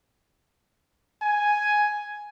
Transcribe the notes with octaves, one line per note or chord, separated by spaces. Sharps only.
G#5